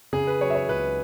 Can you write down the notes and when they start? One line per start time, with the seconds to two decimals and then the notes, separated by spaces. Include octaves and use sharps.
0.13 C#3 G#4
0.27 B4
0.40 F#3 C#5
0.50 E5
0.55 C#5
0.68 C#2 B4